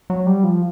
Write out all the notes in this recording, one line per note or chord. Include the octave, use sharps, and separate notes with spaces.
F#3
G3
F3